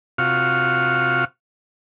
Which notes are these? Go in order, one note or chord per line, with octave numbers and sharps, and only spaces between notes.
C3 F4 F#4 F5 C#6